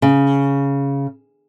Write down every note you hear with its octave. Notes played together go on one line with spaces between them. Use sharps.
C#3